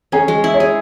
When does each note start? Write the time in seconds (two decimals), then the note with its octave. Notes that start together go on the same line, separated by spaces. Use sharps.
0.12 C#4 G#4
0.28 G#3
0.44 E4
0.54 C#5
0.60 G#4